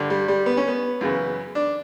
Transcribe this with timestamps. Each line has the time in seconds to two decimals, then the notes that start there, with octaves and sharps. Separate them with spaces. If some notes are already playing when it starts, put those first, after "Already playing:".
Already playing: G2 D3
0.10 G3
0.28 G3
0.46 B3
0.57 C#4
0.68 B3
1.01 F#2 C#3 E3
1.55 D4